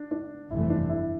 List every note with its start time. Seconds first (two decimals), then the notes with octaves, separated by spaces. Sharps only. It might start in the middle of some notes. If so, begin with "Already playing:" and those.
Already playing: D4
0.11 D4
0.50 G1 F2 C3 E3 A3 E4
0.70 D4
0.89 E4